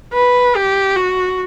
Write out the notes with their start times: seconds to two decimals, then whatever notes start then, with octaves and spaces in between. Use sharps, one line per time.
0.13 B4
0.55 G4
0.96 F#4